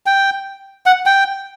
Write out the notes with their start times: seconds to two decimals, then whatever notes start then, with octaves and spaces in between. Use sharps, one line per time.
0.06 G5
0.86 F#5
1.06 G5